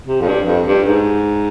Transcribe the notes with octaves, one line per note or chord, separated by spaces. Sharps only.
C3
F2
G2
F2
G2
G#2